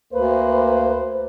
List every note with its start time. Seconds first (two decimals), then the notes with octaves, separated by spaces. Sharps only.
0.13 D2 A#3 B4 C5